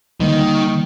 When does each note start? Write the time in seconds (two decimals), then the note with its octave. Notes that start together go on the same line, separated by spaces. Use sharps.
0.20 D3 D#3 G3 A#3